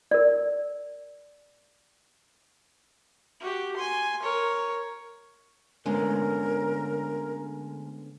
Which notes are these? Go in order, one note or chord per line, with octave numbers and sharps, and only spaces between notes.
A#4 D5
F#4 G4
G#5 C6
A#4 C#5
D2 D3 G#3 B3 C#4 A#4